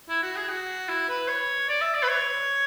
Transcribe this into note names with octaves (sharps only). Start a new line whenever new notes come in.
E4
F#4
G#4
F#4
E4
B4
C#5
D5
E5
D5
B4
C#5